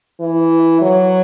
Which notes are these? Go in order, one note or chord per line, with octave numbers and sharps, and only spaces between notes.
E3
F#3